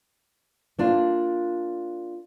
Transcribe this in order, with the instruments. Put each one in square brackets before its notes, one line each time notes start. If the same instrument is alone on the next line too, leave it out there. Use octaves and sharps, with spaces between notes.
[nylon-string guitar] A#3 D4 F4